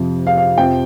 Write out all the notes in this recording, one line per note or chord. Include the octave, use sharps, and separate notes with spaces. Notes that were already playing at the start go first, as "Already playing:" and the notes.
Already playing: F2 C3 F3
F5
F5
F2 C3 F3 G5